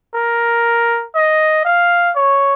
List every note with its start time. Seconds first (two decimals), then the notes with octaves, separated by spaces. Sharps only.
0.15 A#4
1.15 D#5
1.65 F5
2.16 C#5